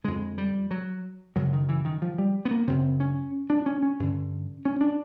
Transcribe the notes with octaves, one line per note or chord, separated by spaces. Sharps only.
F2 D3 G#3
G3
F#3
F#2 C#3 F#3
D#3
E3
D#3
F3
G3
B3
A#3
F#2 C#3 C4
C#4
D4
C#4
C#4
G2 D3
C#4
D4